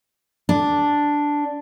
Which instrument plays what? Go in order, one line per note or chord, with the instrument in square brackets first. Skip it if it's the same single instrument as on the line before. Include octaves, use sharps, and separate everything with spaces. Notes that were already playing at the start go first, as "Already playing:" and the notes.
[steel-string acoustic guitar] D4